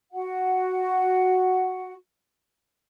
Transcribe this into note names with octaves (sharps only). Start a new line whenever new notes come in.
F#4 F#5